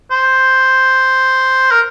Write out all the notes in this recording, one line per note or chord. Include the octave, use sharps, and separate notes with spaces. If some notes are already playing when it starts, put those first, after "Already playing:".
C5
A#4